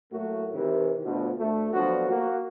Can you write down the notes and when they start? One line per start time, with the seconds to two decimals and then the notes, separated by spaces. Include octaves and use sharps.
0.12 A2 F#3 A3 A#3 F#4
0.54 C3 D#3 E3
1.05 D2 B2 F3
1.39 D2 A3
1.73 D3 F3 F#3 B3 D4 F#4
2.09 A#3 F#4